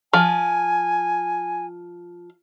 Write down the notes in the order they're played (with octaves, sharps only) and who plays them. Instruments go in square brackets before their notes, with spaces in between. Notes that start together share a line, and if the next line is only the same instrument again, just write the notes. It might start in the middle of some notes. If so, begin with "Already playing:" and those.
[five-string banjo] F3 [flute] G#5